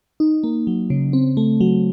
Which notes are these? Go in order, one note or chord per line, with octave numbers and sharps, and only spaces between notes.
D#4
A#3
F#3
C#3
C4
A3
F#3